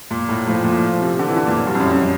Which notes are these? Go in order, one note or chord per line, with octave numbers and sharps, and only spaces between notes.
A#2
A2
A2 F3
A#2
C3
D3
E3
D3
A#2
F#3
G2
F2
F#2
F#2